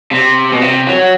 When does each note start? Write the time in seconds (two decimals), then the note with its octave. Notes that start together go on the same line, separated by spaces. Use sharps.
0.11 C3
0.53 B2
0.62 C3
0.87 F#3